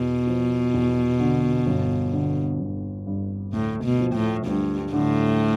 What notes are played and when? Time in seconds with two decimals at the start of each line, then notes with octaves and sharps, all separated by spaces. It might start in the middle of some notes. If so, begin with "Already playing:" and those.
Already playing: E2 B2
0.27 F3
0.73 E2
1.20 D3
1.67 G1
2.13 D3
2.60 G1
3.07 G2
3.53 D2 A2
3.84 B2
4.00 F3
4.15 A2
4.46 D2 G2
4.92 A2 D3